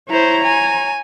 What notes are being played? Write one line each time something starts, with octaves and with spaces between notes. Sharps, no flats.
E4 C5 C#5 A#5
G#5